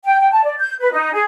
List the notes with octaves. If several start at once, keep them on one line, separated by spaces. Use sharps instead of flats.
G5
G5
A5
D5
G6
B4
D#4
G#4